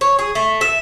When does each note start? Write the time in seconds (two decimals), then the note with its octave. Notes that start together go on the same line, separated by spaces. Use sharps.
0.01 C#5
0.19 G#4
0.35 A3
0.61 E5